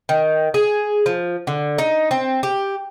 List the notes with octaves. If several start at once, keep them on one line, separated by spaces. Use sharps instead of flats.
D#3
G#4
F3
D3
D#4
C4
G4